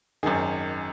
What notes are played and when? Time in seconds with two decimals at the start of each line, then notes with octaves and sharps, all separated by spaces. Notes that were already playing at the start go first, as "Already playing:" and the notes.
0.23 G#1 F#2 D#3 G#4